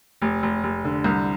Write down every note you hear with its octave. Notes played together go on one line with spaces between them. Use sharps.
F1
F1
F1
D3
C2